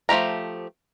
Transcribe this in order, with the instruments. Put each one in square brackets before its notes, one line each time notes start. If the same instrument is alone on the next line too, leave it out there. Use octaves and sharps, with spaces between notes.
[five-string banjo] F3 A3 G4 A#5